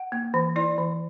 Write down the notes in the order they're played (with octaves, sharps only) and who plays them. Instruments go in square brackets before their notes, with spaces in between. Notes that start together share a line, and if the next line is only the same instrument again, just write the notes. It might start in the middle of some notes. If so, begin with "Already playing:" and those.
Already playing: [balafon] F#5
A#3
E3
E4 D5
E3